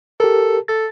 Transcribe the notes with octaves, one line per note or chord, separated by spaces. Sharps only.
G4 A4 A#4
A4 A6